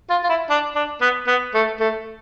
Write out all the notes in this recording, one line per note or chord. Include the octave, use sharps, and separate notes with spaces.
F4
F4
E4
D4
D4
B3
B3
A3
A3